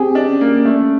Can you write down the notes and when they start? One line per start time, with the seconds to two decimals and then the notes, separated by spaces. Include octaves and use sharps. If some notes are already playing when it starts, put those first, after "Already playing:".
Already playing: C4 G4 G#4
0.15 D4
0.27 C#4
0.41 A#3
0.65 A3